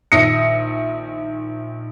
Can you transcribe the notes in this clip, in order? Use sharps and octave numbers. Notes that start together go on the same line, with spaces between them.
A#1 D#3 E5 D#6 A#6 C#7